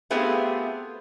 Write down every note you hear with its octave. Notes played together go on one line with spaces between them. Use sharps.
A3 B3 C4 F4 G4 G#4